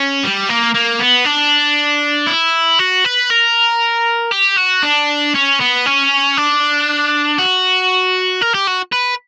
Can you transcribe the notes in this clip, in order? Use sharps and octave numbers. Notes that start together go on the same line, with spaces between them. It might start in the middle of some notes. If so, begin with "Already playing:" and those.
Already playing: C#4
G3
A#3
A#3
B3
D4
E4
F#4
B4
A#4
G4
F#4
D4
C#4
B3
C#4
D4
F#4
A#4
G4
F#4
B4